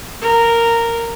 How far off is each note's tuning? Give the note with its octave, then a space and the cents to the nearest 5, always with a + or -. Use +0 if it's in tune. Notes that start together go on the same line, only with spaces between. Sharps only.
A#4 -10